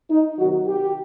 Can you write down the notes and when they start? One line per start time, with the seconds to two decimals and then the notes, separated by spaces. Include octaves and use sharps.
0.11 D#4
0.39 C3 D#3 F#3 F#4
0.67 G4